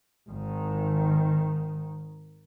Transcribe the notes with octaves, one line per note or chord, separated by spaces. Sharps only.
G#1 D#3